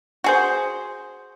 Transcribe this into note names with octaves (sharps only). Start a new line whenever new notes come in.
F#4 G#4 C5